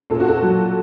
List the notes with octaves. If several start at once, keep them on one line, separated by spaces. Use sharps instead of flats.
A#2 A4
F#4
A4
F#3